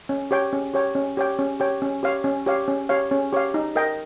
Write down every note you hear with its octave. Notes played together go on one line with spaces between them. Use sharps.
C#4
G4 C#5 G5
C#4
G4 C#5 G5
C#4
G4 C#5 G5
C#4
G4 C#5 G5
C#4
G4 C#5 F5
C#4
G4 C#5 F5
C#4
G4 C#5 F5
C#4
G4 C#5 F5
D#4
A#4 D#5 G5